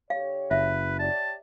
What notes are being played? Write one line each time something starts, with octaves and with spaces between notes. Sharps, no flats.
D3 G4 C#5 F5
F#1 B4 E5
G4 C#5 D5 A5